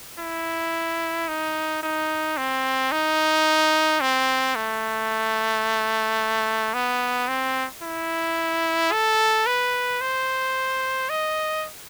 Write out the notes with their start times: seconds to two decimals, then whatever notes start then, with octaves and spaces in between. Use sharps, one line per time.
0.19 E4
1.28 D#4
1.83 D#4
2.37 C4
2.92 D#4
4.01 C4
4.56 A3
6.74 B3
7.28 C4
7.83 E4
8.92 A4
9.47 B4
10.01 C5
11.09 D#5